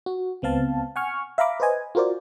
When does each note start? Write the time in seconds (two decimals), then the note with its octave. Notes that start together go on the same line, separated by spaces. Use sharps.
0.06 F#4
0.42 C#2 B3 C4 F5 A5
0.96 F#5 G#5 C#6 F6
1.38 E5 F5 A#5 B5 D6
1.60 B4 C5 D#5 G#5
1.95 F4 F#4 A#4 C5 D5